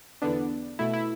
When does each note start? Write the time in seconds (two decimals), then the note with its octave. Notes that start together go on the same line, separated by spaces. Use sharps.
0.22 E2 D3 B3 D4
0.79 B2 A3 E4
0.93 E4